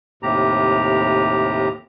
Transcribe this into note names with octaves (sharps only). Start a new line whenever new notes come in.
D#2 A2 C3 G4 A#5